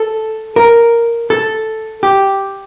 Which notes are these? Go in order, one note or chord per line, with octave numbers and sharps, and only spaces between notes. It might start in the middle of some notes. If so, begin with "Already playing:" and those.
Already playing: A4
A#4
A4
G4